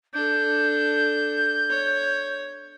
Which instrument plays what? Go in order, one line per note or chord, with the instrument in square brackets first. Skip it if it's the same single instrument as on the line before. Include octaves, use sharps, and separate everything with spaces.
[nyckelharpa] D4 A4 [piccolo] G6
[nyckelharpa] C#5